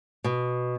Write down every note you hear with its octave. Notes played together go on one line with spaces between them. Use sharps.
B2